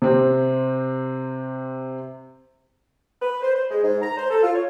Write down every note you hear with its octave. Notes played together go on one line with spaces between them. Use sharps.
C3 C4
B4
C5
C5
G#3
G#2
A#5
C5
A4
F4
C#5